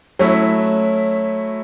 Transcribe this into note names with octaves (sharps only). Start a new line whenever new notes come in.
F#3 A3 C#4 E4